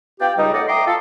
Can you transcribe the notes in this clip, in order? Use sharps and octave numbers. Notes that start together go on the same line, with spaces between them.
B3 F4 G4 D5 G5
C#2 G3 D#4
A3 C#4 A4 D5 D#5 F#5
E5 G5 A#5 C6 D6 D#6
F4 A4